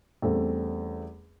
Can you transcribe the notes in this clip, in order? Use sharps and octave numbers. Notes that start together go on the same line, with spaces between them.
E2 G3 A3 C4 C#4 A4